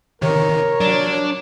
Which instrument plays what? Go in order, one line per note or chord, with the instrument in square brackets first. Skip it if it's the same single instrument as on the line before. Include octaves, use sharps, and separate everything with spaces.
[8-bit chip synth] C3 D#3 [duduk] A#4 [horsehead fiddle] C#5
[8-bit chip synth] F#3 [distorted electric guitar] D4